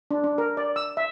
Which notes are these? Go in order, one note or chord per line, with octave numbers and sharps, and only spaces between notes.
D4
D4
A#4
D5
E6
E5